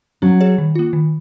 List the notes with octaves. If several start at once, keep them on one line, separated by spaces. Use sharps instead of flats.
F#3 C#4
G#4 C#5
D#3
A#3 F4
D#3